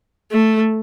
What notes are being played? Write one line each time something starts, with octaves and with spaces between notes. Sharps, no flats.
A3